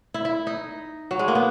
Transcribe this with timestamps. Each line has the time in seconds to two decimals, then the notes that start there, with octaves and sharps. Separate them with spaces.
0.14 E4
0.25 E4
0.47 D#4
1.11 F#3
1.19 G#3
1.28 A#3
1.35 B3